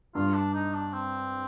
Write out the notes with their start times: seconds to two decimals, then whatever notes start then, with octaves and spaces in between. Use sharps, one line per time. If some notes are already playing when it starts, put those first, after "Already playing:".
0.15 G2 F4
0.34 D4
0.54 D#4
0.74 D4
0.93 C4